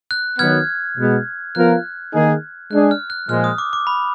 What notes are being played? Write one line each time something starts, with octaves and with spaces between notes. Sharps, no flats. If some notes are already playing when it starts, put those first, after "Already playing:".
F#6
D#3 F#3 B3 F6 G#6
B2 G#3 B3
F3 B3 F4 A#4 F#6
D#3 A#3 D#4 G#4
G#3 D4 G#4 F#6
F6
F#6
A#2 F3 G#3 F6
D#6
D6
D6
B5